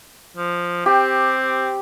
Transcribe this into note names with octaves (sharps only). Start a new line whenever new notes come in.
F3
C4 G4